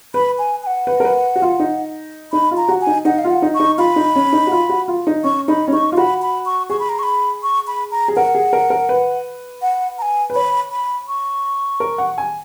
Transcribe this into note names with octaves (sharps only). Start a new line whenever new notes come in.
B4 B5
G#5
G#5
F#5
B4
A#4
B4
F#4
F4
D#4
D#4 B5
F4
A#5
F#4
G#5
D#4
D#4 F#5
F5
F4
F#5
D#4
C#6
D#4
F4 B5
D#4
C#4
D#4
F#4
F4
F#4
F4
D#4
C#4 C#6
D#4 B5
C#4
D#4 C#6
F4
F#4 B5
B5
C#6
G#4 C#6
B5
A#5
C#6
B5
C#6
B5
A#5
G#4
A#4 F#5
G#4
A#4
A#4
B4
F#5
A#5
G#5
B4
C#5 B5
B5
C#6
A#4
F#5
G#5